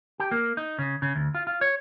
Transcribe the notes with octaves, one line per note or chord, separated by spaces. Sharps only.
G4
A#3
D#4
C#3
C#3
D2
F4
F4
C#5